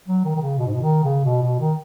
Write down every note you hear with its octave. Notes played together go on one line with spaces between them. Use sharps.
F#3
D#3
D#3
C#3
B2
G#2
B2
D#3
C#3
B2
B2
D#3